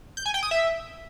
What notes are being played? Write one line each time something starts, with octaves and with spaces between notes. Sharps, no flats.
G6
G#5
G5
D#6
E5